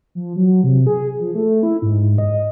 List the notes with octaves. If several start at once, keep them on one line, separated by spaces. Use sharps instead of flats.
F3
F#3
C3
G#4
F3
A3
E4
G#2
D#5